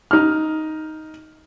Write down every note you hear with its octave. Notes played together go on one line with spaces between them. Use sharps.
D#4 F6